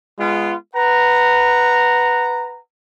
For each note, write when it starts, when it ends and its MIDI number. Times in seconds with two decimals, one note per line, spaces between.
0.19 0.55 56
0.19 0.55 59
0.19 0.55 65
0.75 2.60 71
0.75 2.60 78
0.75 2.60 82